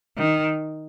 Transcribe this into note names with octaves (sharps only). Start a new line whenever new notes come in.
D#3